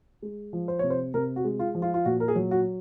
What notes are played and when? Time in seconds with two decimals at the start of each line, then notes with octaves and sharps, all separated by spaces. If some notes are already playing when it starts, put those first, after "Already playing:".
0.22 G#3
0.53 F3
0.68 C5
0.79 C3 C#5
0.90 C5
1.14 C3 A#4
1.36 F#4
1.44 G#3
1.59 F4
1.75 F3
1.82 F4
1.94 F4
2.05 A#2 F#4
2.20 A#4
2.28 G#4
2.36 F#3
2.51 F#4